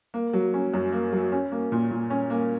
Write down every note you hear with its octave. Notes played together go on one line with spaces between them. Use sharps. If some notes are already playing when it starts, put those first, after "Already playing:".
A#3
F#3
C#4
F#2
A#3
F#3
C#4
A#3
A#2
A#2
C#4
A#3